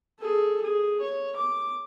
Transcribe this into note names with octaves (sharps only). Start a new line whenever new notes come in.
G#4 A4
G#4
C#5
D6